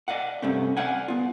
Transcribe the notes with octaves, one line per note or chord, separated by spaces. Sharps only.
D5 D#5 F5 F#5
G2 C3 A3 C#4
D5 F5 F#5 G#5
B3 F4